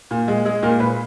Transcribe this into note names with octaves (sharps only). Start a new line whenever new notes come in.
A#2
G#3
G#3 G#4
A#2 A#4
A#2 B4